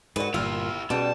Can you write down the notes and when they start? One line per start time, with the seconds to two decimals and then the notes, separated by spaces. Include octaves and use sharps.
0.16 G#2 F#4 A#4 B4 D5
0.34 G1 A#2 E4 F4 G4 E6 F6
0.90 B2 G3 C#4 G#4 D5 A5